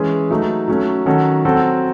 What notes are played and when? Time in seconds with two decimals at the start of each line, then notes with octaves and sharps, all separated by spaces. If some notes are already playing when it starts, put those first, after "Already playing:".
Already playing: E3 G#3 C#4 G#4
0.30 F#3 A3 D#4
0.68 F#3 A3 C#4
1.06 D#3 F#3 C#4 F#4 A4
1.45 F#3 C4 F#4 A4